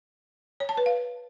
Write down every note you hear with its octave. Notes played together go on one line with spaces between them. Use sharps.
C#5
A5
B4
F5